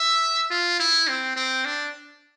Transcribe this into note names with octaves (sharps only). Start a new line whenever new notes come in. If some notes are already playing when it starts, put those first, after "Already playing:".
Already playing: E5
F4
E4
C4
C4
D4